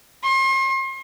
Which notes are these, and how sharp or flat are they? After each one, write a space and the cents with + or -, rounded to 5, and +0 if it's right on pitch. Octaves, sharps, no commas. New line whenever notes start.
C6 +40